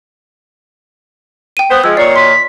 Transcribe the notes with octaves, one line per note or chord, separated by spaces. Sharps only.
G5 D#7
B3 C5
F3 G#3 E6 G#6
A#2 D#3 C#5 D5 C7
C6 B6